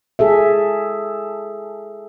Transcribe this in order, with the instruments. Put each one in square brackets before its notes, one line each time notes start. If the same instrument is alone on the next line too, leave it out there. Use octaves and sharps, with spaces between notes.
[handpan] G#4 A4 E5